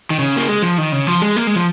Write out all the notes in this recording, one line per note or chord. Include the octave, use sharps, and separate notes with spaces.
D#3
C#3
A#3
G#3
F3
D#3
C#3
F3
G#3
A#3
G#3
F3